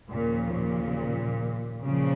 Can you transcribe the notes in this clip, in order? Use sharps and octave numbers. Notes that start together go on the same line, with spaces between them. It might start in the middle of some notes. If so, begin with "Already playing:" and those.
D#2 A#2 C#3 F3
A#2
A#2 C#3 F3